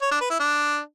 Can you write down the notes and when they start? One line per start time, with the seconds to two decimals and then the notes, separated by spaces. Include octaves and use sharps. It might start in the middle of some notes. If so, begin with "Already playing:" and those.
0.02 C#5
0.11 D4
0.21 B4
0.30 E4
0.40 D4